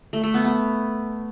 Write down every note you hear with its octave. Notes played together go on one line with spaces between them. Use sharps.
A3
A3
B3
B3